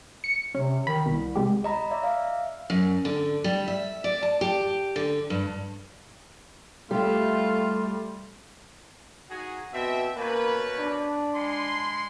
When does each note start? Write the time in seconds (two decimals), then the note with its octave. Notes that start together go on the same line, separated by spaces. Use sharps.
0.24 C#7
0.55 C3 C#4
0.87 D#3 B5
1.06 C2 B2
1.35 C3 G#3 G4
1.64 D#5 A#5 B5
1.91 D5 E5
2.03 E5 F5
2.70 F#2
3.05 D3
3.44 G3
3.68 E5
4.04 D5
4.23 A5
4.41 G4
4.96 D3
5.30 G2
6.91 G3 A3 F4 G4 E5
9.30 D#4 F#4 G#4
9.74 B2 C4 E5
10.17 B2 A#3 C#4 B4
10.79 D4
11.35 G#3 B5 C6